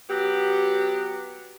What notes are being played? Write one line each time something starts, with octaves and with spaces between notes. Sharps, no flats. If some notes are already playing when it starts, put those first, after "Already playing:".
F#3 B3 G4